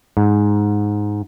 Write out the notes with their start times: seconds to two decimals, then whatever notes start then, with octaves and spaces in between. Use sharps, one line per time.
0.17 G#2